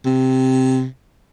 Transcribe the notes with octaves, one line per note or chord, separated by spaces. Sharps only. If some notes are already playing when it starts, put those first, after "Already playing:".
C3